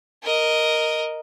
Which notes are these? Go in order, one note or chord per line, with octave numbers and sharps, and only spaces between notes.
A#4 D#5